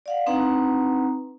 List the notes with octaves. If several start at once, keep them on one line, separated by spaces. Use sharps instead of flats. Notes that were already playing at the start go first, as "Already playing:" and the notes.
D5 F5 F#5
C4 D4 D#4 B4 F#5 A#5